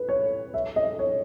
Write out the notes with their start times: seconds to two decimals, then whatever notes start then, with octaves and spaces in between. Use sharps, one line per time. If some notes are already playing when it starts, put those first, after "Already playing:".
Already playing: B4
0.09 C#5
0.54 E5
0.76 D#5
0.99 C#5